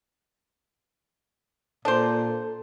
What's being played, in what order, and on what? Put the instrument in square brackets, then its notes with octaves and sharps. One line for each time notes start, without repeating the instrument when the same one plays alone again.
[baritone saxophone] A#2 [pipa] D4 C5 [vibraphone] A4